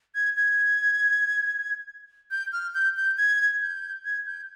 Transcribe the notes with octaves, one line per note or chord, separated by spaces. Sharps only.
G#6
G#6
G6
F6
G6
G6
G#6
G6
G#6
G6